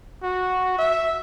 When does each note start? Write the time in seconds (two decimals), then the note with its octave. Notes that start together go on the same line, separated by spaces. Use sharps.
0.23 F#4
0.78 E5